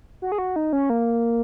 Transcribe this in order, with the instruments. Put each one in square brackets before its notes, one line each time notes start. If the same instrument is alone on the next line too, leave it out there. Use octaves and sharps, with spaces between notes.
[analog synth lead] F#4
G#4
F#4
D#4
C#4
A#3